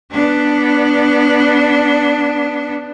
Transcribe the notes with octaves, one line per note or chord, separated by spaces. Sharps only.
B3 D4